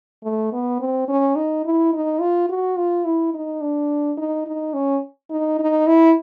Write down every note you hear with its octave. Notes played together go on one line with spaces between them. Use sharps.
A3
B3
C4
C#4
D#4
E4
D#4
F4
F#4
F4
E4
D#4
D4
D#4
D#4
C#4
D#4
D#4
E4